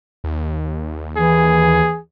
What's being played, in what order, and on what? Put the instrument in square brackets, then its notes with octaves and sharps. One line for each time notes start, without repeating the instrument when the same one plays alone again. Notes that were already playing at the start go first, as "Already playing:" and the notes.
[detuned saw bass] D#2
[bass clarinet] E3 [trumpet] G#4